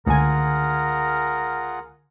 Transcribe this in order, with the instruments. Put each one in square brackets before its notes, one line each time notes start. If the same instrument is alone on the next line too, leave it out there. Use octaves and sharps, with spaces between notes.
[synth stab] C#2 G#5 [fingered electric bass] D3 A3 [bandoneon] F4 G#4 F#5 [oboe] A#4